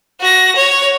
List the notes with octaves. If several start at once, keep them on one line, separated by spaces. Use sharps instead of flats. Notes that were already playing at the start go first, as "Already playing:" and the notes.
F#4 A#6
C#5